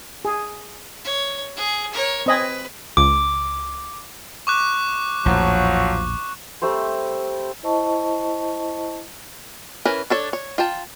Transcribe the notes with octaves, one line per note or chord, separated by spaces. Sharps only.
G#4
C#5
G#4
A#4 C#5
C4 B4 D#5 G#5
C#2 D6
C#6 D6 F#6
A#1 E2 A2 F3 F#3
G3 A3 C4 C5
E4 C5 D#5 A5 C#6
E3 C#4 A#4 B4
D4 A4 C#5
C#5
F4 G5 A5